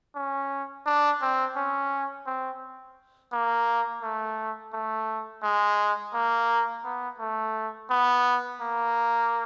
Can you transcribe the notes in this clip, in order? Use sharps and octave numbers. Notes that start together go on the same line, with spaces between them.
C#4
D4
C4
C#4
C4
A#3
A3
A3
G#3
A#3
B3
A3
B3
A#3